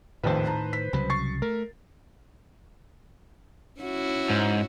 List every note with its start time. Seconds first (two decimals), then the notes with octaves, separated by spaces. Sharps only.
0.23 F1 A#1 D#2 A2 D#3 B4 C5
0.46 A5 A#5
0.73 B6
0.93 C2 C#3 F#3 B5
1.10 C#6 A6 C7
1.42 A3 A#4
3.81 C#4 E4 F#4
4.30 G#2